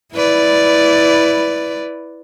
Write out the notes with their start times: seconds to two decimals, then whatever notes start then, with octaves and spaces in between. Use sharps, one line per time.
0.13 E4 B4 D5